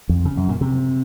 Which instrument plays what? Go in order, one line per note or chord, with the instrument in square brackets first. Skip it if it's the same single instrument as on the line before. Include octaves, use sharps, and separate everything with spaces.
[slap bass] F2
C#3
F#2
A#2
C3